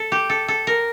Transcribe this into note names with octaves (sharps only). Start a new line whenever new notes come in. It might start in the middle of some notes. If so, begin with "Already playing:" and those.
Already playing: A4
G4
A4
A4
A#4